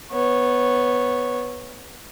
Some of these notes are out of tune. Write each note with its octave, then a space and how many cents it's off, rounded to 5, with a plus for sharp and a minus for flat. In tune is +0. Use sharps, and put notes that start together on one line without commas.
B3 +0 C#5 -10